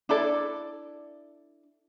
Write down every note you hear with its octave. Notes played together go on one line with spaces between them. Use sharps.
D4 E4 A4 D5